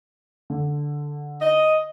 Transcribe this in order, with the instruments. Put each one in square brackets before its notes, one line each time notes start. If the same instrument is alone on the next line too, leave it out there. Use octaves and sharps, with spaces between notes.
[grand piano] D3
[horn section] D#5